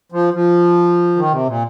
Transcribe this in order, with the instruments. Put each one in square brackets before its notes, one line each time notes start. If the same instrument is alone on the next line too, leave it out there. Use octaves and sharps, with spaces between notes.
[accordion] F3
F3
D#3
C3
A#2